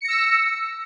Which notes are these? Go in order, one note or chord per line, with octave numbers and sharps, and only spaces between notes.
E6 A#6 C#7